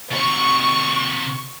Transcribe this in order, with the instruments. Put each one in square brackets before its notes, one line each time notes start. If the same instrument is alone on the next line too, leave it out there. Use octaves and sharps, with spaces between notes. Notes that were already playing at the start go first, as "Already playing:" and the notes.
[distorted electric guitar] C3 F#4 [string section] C#6